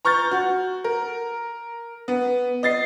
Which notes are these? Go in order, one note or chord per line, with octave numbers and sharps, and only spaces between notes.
A#5 C#6 F6 G6 A6
F#4
A#4
B3
D#5 A6 C7